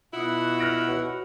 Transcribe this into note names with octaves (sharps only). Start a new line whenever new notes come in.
B2 E4 F4 F#5 D#6
F6 A#6 D7
F#4 B4 C#5